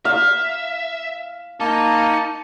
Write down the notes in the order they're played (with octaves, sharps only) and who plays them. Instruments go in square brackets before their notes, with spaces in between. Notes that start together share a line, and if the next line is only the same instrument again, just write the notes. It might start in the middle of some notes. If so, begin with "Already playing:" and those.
[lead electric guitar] E5 [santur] F5
[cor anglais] A#3 [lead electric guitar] D#4 [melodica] A5